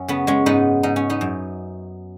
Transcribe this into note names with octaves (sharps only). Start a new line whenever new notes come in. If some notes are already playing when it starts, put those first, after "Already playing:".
Already playing: F#2 C#4
C#3 B3
G#3 C#4
G#2 B3 D#4
G#2 D#4
C#4
B3 D#4
F#2